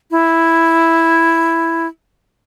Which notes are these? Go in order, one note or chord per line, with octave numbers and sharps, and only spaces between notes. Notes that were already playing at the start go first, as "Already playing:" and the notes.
E4